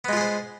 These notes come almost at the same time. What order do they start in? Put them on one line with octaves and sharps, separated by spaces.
B3 G#3 F4 G#4 C5